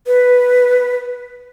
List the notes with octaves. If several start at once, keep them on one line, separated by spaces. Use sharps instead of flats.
B4